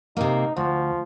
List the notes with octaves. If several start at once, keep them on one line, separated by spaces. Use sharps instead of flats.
C3 A#3 D#4
D2 F3